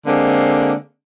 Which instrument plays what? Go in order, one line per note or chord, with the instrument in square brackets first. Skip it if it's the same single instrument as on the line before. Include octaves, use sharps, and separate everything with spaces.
[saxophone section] D3 G#3 A#3 C4